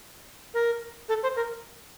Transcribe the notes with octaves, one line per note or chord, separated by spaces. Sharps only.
A#4
A4
C5
A#4